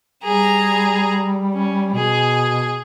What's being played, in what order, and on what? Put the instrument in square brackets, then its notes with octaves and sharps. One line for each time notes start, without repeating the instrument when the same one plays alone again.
[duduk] G3 [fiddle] G#4 A#5
[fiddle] C#4
[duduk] B2 [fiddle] G#4